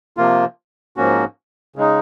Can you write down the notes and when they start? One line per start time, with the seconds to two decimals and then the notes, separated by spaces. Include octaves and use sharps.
0.17 C3 F3 A#3 F4
0.96 G#2 F3 A#3 C#4 F#4
1.76 C#3 G#3 D#4